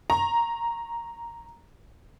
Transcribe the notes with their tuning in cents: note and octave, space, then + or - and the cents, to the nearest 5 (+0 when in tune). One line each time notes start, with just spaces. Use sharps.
A#5 +0 C#6 -35